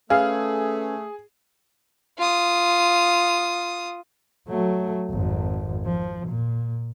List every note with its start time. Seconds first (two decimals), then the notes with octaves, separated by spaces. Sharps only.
0.10 A3 C#4 G#4 A4 B4 F5
2.18 F4 D#6
4.48 F#3 A3
5.10 G#1 F2
5.85 F3
6.28 A#2